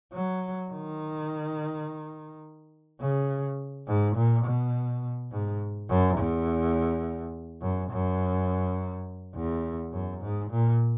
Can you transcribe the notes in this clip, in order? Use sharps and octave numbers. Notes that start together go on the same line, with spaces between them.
F#3
D#3
C#3
G#2
A#2
B2
G#2
F#2
E2
F#2
F#2
E2
F#2
G#2
A#2